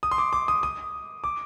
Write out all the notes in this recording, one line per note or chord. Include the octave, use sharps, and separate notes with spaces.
D#6
C6
D6
D6
D#6
D#6
D6